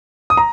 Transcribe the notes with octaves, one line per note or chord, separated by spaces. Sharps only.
D#6
A#5